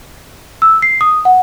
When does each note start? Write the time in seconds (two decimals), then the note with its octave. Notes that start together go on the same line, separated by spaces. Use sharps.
0.62 E6
0.82 C7
1.01 D#6
1.25 F#5